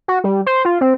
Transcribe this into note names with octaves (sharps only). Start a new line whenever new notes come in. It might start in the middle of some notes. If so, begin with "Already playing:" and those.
F#4
G3
C5
F4
C4